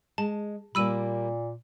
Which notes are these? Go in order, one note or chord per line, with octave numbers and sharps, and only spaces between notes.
G#3 A5
A#2 G3 A#3 B5 E6 D#7